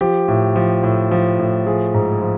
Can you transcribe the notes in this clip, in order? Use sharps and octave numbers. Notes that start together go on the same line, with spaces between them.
F3 G4
A2
F3
A2
F3
A2
F3 G#4
G#2
F3